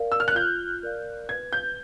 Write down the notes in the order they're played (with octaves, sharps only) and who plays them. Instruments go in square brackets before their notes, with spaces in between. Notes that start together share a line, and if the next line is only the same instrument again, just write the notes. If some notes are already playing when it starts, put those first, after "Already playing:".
Already playing: [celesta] A#4 D5 F5
[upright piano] E6
F6
F#6
[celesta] F4 [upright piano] G6
[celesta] A#4 D5 F5
[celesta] B4 [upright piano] G#6
[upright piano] G6